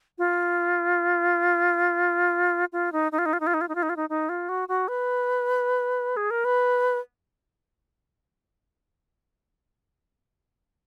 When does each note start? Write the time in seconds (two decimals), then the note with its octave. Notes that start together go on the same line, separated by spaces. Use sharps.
0.18 F4
2.73 F4
2.92 D#4
3.12 D#4
3.19 F4
3.26 D#4
3.33 F4
3.40 D#4
3.47 F4
3.54 D#4
3.61 F4
3.69 D#4
3.75 F4
3.83 D#4
3.89 F4
3.97 D#4
4.10 D#4
4.29 F4
4.49 F#4
4.69 F#4
4.88 B4
6.17 G#4
6.31 A#4
6.45 B4